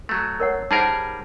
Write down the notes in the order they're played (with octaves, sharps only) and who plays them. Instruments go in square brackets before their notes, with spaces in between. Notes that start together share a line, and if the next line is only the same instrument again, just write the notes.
[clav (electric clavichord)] F#3 A3
[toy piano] A#4 C#5 F#5
[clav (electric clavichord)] G3 G#4 A#4 [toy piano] D#4 C5 F#5